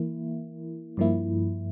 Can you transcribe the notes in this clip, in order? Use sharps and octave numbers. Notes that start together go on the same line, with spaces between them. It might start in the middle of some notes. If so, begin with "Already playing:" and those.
Already playing: E3 A#3 E4
G2 F3 A#3 E4